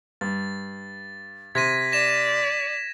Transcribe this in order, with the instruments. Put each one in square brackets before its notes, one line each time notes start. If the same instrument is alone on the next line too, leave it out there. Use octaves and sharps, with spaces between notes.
[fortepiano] G2 [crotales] A6
[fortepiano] C3 [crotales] G#6 A#6 D#7 [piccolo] B6
[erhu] D5 [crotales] A#6 E7